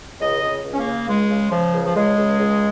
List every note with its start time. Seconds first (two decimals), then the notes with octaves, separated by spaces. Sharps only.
0.20 C#2 D#5
0.41 C#2
0.64 C#2
0.73 C#4
0.79 A#3
0.86 C#3
1.08 C#2 G#3
1.30 C#3
1.51 C#3 F3
1.73 C#2
1.85 F3
1.95 C#2 G#3
2.17 C#2
2.39 C#2